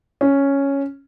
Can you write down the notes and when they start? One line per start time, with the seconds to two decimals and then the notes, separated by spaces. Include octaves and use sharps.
0.21 C#4